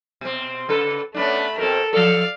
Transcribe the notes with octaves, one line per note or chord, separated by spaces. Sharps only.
B2 C4
C#3 A4 B4
A3 B3 C#4 D4 B5
B2 C4 A4 A#4
F3 A4 D5 F5